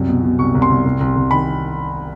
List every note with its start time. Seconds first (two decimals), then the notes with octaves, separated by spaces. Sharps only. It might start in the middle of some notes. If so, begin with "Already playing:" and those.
Already playing: C2 F#2
0.08 B2
0.23 B2
0.39 C2 C#6
0.55 C2
0.62 C6
0.69 C2
0.85 C2
1.00 C2
1.16 C2
1.31 D#3 B5